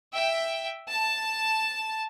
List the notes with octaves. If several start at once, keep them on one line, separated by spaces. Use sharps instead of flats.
E5 G5
A5